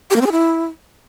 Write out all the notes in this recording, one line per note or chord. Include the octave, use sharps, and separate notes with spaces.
G4
A#3
C4
G#4
E4